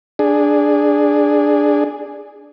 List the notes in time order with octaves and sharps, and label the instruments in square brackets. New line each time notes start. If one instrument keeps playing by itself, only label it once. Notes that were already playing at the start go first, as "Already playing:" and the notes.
[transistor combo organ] D4 G#4